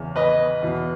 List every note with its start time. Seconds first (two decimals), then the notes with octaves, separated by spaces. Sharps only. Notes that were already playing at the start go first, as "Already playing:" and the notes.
Already playing: E2 C#3
0.16 B4 D#5
0.62 E2 B2